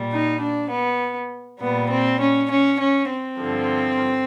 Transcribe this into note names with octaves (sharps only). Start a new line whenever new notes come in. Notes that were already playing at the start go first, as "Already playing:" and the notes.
Already playing: A#2 G3
D#4
D4
B3
A#2 G3 B3
C4
C#4
C#4
C#4
C4
G2 D3 F3